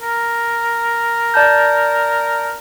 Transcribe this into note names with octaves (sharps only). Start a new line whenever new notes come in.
A#4
D5 A5 G6